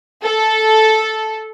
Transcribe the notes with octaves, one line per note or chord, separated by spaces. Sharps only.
A4